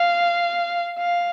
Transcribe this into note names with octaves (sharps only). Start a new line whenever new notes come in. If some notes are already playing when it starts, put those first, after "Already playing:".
Already playing: F5
F5